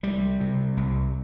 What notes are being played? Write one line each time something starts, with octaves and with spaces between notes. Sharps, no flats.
C2 G3
C3
C2